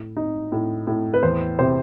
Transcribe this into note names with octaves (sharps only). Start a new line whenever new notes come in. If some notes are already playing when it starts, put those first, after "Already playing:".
Already playing: A2
D#4
A2
A2
B4
E2 C5
C3 C5